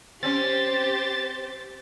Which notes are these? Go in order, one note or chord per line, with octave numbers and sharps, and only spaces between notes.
C4 C#4 G4 C5 A6